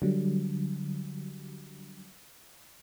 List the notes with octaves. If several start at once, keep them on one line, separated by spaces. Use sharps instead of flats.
D3 F#3 G3